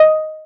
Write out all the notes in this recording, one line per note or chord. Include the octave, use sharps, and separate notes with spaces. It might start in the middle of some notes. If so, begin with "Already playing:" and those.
Already playing: D#5